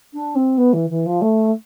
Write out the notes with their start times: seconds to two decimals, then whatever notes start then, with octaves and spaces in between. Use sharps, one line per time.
0.13 D4
0.35 C4
0.57 B3
0.73 E3
0.89 E3
1.05 F3
1.21 A3